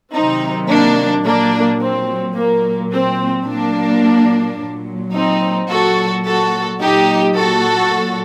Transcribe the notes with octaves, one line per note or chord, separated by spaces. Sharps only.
C3 D#3 F#3 C4 D#4
A#3 D4
A#2 F#3 A#3 D4
C4
A#2 F#3 A#3
C4
A#2 F#3 A#3 D4
A#2 F#3
C4 D#4
A#2 F#3 F#4 A4
F#4 A4
A#2 F#3 D#4 G4
F#4 A4
A#2 F#3